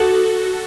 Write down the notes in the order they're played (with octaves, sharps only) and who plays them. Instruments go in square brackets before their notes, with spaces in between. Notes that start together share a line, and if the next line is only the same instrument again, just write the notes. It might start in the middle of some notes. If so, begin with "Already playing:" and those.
Already playing: [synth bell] F#4 A4